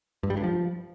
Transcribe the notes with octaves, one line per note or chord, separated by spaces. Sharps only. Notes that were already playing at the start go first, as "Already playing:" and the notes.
G2
G3
G2
F3